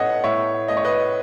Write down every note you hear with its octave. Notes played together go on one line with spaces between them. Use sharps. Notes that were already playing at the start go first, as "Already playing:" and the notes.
Already playing: A2 B3 A4 C#5 D#5 F#5
A2 C#5 E5
A3 D#5
C#5
B4 D#5